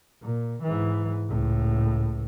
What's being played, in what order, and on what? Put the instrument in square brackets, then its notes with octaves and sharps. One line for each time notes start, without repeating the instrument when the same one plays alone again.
[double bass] A#2
G#2 E3
C#2 A2